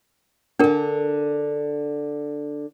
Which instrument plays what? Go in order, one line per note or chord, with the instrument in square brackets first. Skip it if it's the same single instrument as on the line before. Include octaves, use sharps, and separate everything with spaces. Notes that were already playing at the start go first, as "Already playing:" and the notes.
[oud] D3 A4 [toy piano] D4 A#4